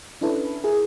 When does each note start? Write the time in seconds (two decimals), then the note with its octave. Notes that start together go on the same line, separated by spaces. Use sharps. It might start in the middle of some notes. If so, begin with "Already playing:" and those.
0.21 C#4 D4 E4 A4 B4
0.64 E4 G#4 A#4